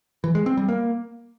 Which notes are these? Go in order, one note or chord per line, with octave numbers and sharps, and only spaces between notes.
E3
G#3
C4
G3
A#3